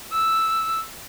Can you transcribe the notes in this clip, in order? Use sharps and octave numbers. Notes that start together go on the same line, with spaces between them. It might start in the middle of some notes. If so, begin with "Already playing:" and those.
E6